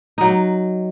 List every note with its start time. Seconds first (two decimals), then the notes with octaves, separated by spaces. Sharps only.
0.18 F#3 D#4